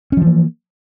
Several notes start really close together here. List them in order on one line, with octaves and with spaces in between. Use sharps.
C#4 F3 E3 A#3